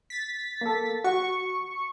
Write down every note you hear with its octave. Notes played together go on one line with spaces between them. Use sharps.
A6 B6
A#3 A4
F#4 C#6